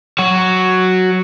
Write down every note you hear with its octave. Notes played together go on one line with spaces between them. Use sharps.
F#3 F#4